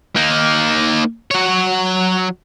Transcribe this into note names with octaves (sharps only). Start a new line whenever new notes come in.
A#3 D#4
F#3 C#5